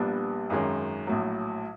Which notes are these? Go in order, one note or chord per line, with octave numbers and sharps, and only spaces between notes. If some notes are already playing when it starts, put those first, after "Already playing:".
Already playing: A#1 A#2 G3 B3 D4
G#1 F#2 D#3 G#3 C#4
A#1 A2 F#3